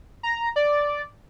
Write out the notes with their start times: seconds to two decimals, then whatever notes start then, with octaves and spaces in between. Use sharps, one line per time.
0.23 A#5
0.56 D5